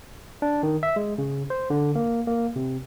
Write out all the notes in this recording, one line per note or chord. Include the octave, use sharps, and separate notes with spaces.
D4
D#3
E5
G#3
C#3
C5
D3
A#3
A#3
C3